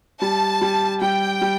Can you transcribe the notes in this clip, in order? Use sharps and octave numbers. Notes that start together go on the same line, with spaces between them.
G3 A5
G3
G3 G5
G3